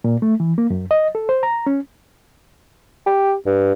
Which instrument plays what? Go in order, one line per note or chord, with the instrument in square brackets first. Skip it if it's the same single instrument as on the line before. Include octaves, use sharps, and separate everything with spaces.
[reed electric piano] A#2
A3
E3
A#3
F#2
D#5
A4
C5
A#5
C#4
[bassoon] G4
G2